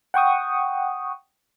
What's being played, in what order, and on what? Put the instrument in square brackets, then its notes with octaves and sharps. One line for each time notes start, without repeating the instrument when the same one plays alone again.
[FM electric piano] F#5 G5 C#6 D#6